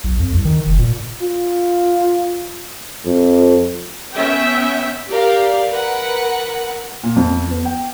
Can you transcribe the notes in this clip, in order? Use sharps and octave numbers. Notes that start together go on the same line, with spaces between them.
B1
F2
C2
D#3
F1
A#2
F4
F2
B3 C#4 E5 G5
G4 A#4 D5 F5
A#4 B4 F#5
A#2
F2
B3
G5